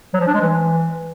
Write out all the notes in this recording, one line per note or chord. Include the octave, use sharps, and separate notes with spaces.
F#3
F3
D4
G#3
E3